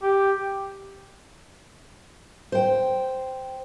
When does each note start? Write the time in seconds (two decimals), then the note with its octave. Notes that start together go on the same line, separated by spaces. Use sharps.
0.02 G4
2.52 C5 G5